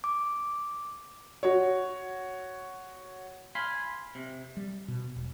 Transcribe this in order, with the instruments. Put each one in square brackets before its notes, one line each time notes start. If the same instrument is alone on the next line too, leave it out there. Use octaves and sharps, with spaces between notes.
[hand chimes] D6
[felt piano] F#4 C#5
[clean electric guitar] F5 G#5 B5 C6
C3
[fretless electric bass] G3
B2
E1